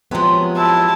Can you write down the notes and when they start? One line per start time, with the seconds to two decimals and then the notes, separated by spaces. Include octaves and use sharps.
0.11 C3 F3 F#3 G#3 B3
0.58 E4 A5